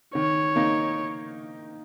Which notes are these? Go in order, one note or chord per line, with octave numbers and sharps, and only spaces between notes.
D#3 C#5
A#3 D#4